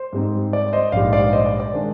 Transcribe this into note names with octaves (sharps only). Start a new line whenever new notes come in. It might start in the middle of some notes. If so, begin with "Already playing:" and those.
Already playing: C5
G#2 G3 C4 D#4
D5
C5 D#5
A#1 G#2 G3 D5 F5
D5 F5
C5 D#5
D5
D5
D#3 G#3 D4